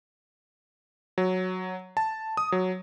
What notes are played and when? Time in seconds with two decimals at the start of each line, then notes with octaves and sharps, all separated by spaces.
1.18 F#3
1.97 A5
2.37 D#6
2.52 F#3